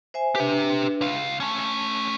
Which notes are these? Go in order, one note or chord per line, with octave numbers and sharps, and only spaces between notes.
C5 E5 G#5
D4 G4 B4 E5
C#2 F5
A3 C#4 A5